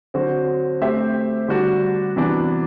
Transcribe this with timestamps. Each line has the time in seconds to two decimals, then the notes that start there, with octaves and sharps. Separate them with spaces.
0.14 D3 F#3 C4 F#4 C5
0.81 A3 C4 G4 C5 E5
1.48 D3 G3 D4 F#4
2.16 C3 E3 B3 D4 F#4